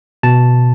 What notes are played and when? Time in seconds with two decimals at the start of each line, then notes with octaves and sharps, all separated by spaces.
0.23 B2 A5